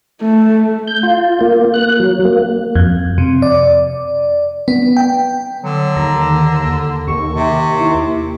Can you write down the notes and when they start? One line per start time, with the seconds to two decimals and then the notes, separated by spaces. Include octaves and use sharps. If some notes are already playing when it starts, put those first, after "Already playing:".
0.21 A3
0.87 G6
1.03 F4
1.41 A#3
1.74 F#6
2.00 F#3
2.25 A#3
2.75 F2
3.18 C3
3.42 D5
4.68 B3
4.97 G5
5.63 D3 F#3
5.96 D#2 A#5
7.08 D#2 C#6
7.33 C3
7.80 E4